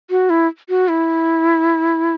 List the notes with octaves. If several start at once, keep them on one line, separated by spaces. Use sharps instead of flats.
F#4
E4
F#4
E4